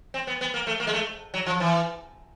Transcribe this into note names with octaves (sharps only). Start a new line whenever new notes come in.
C4
B3
B3
A#3
A3
A#3
G#3
A3
F#3
F3
E3